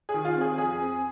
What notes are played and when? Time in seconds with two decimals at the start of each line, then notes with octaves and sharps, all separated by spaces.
0.09 G#4
0.14 D#3
0.25 F4
0.36 C4
0.41 G#4
0.58 F2 G#4
0.80 C4